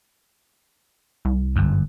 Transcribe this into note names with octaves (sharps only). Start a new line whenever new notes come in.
C2
G1 F#2